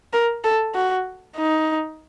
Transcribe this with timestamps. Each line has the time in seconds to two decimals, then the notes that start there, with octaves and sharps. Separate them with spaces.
0.13 A#4
0.44 A4
0.75 F#4
1.37 D#4